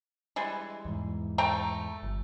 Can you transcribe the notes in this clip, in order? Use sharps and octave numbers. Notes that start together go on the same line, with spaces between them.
E3 G3 G#3
E2 G#2
A3 G5 A#5
G1